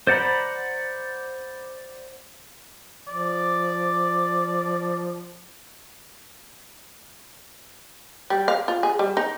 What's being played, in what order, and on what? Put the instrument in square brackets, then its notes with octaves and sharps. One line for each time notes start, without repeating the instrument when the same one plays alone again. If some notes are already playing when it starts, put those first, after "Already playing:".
[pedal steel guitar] C5 D5 F#5 A#5 B5
[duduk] F3 [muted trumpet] D5
[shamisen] G3
F5
F4
G#4
G3
D#4